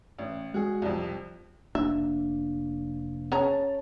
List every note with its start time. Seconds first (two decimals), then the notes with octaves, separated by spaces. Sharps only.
0.19 A1
0.54 G#3 F#4 G#4
0.82 C2 F2
1.75 F1 A#3 D4 E5
3.32 C#4 G#4 C#5 A5 A#5